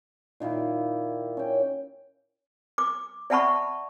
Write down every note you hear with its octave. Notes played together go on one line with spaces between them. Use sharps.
A#2 D#3 A#3 E4
C#4 G5
D6
D5 E5 F#5 A5 B5 C#6